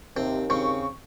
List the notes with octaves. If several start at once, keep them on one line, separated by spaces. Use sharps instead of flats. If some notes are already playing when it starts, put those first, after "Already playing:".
D#2 C3 C4
C#3 C4 C#6